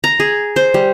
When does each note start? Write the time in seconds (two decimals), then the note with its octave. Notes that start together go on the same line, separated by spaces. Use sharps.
0.04 A#5
0.20 G#4
0.56 C5
0.74 G3